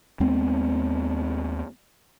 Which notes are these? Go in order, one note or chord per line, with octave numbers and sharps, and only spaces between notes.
D#2 G#3 B3 C4